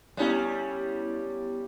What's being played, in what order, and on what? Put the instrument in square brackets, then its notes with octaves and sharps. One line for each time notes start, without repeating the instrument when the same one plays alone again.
[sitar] G3 C#4 [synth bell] B3 E4 G4